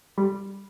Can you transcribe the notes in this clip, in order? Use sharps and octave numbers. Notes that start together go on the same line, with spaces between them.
G3